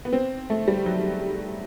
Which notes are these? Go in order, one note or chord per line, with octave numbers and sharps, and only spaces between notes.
B3
C4
A3
G3
F#3